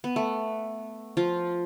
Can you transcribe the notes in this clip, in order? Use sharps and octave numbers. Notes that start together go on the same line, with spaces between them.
B3
A3
F3 F4